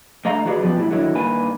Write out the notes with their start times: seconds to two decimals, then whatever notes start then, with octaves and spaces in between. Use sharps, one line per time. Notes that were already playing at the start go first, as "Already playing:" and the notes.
0.25 D3 A3 D#5 F5 A#5
0.45 D#3 D4 F#4 G#4 B4 D5
0.60 F#2 F3 B3 G4
0.76 A#2 G3 E4
0.91 D3 D#3 F#3 E4 A#4
1.14 G2 D#3 A#3 B4 G#5